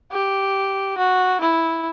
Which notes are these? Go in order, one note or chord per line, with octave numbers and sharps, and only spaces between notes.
G4
F#4
E4